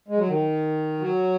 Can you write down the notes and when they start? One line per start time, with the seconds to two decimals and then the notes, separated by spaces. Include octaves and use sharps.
0.08 G#3
0.18 F#3
0.28 D#3
0.99 F#3